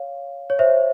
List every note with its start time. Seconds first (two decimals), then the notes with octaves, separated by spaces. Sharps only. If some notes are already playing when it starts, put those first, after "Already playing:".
Already playing: C#5 F5
0.50 C#5
0.59 C5 E5